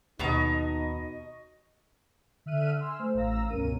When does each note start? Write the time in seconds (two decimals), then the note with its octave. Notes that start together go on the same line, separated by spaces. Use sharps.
0.19 D#2 B2 D#4 D#5 A5 A#5 C#6 D#6
2.46 D3 E5 F6 F#6 D#7
2.80 G#5 C6 E6 F6
2.99 A3 C5
3.14 A1 A2 F5 A#5 E6 A#6
3.49 C#2 G2 B2 C#4 A#4 D#7